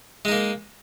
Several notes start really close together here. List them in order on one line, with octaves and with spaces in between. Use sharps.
G#3 D#4 A#3